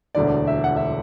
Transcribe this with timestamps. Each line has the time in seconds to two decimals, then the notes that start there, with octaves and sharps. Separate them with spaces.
0.15 E1 D2 D3 D5
0.47 E5
0.64 F#5
0.77 E5